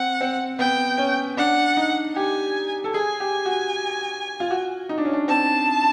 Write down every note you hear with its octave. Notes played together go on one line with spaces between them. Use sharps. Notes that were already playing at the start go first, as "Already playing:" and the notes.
Already playing: C4 F#5
C4
B3 G5
C#4
D4 F#5
D#4
G4 G#5
A4
G#4 G#5
G4
F#4
F4
F#4
D#4
D4
C#4
D4
C4 A5